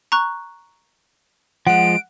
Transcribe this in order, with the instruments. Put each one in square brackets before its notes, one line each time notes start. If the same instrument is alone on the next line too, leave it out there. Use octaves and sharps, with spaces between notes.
[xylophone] A#5 C#6 F#6
[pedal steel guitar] F3 G#3 [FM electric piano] F#5 [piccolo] D7